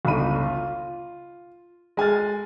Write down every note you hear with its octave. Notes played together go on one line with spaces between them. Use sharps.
G1 C#2 D#4 B5 D#7
F4
G#3 G#5 F6 A6